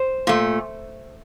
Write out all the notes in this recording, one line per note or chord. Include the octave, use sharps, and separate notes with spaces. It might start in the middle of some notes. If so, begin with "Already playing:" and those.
Already playing: C5
A#2 A3